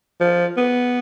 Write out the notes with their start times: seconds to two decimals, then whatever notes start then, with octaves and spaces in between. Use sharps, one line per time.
0.20 F3
0.57 B3